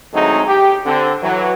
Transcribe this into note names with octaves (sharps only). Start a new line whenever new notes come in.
D3 F#3 G#3 A3 C4 D#4
G4
D3 C4
E3 F#3